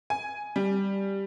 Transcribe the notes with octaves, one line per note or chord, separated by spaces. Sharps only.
G#5
G3